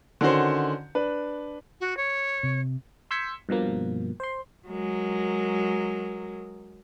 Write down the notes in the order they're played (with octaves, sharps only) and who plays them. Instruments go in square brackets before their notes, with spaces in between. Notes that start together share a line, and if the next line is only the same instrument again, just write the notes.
[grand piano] D3 D#3 C#4 F#4 C5
D4 B4
[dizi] F#4
C#5
[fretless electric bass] C3
[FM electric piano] C6 E6 G6 G#6 B6 C#7
G2 B2 F3 A#3
C5 C6
[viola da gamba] F#3 G#3 A#4